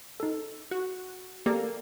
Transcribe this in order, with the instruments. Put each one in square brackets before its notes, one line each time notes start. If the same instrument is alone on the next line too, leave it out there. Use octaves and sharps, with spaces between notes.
[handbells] D#4 A4
[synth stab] F#4
[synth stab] A#3 [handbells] G4 A4 D5